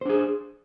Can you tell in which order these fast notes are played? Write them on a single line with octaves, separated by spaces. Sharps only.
C5 D4 G#4